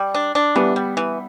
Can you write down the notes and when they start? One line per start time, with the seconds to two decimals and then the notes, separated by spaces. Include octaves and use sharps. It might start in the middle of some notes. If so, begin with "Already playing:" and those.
Already playing: G3
0.15 D4
0.35 D4
0.55 E3 G3 B3
0.76 G3
0.97 E3